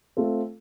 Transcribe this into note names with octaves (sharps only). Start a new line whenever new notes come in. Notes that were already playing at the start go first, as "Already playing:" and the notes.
A3 C4 F4 A4